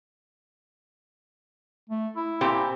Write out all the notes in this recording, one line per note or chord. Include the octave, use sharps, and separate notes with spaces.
A3
E4
A#2 C4 G4